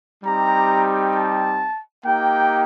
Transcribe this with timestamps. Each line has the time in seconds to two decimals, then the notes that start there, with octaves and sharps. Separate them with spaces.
0.23 G3 C4 D#4 G4 A#5
1.15 A5
2.05 A#3 D#4 G4 G5